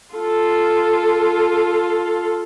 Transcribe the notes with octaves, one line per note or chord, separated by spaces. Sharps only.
F4 A4